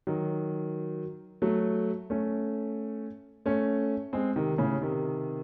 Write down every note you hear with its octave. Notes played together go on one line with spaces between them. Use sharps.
D#3 F#3
F#3 A3
A3 C#4
A3 C#4
G#3 C4
C3 D#3
A2 C#3
C3 D#3